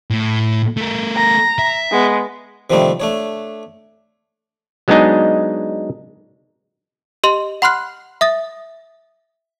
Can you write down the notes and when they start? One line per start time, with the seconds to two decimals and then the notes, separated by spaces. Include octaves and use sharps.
0.11 A2
0.77 A3 A#4
1.17 A#5
1.59 E5
1.92 G#3 B3
2.70 C3 D#3 F3 G3 A3 D4
3.00 A3 D4 C#5
4.88 F#3 G#3 B3 D4 D#4 G#4
7.24 G4 D#5 C6 F7
7.62 F#5 B5 C6 F6 F#6 C7
8.21 E5 D#6 A6